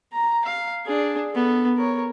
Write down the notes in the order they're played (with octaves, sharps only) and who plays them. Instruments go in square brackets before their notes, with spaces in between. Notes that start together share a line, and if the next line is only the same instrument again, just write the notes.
[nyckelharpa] A#5
F5
D4 G#4
B3 A4
A#4 C#5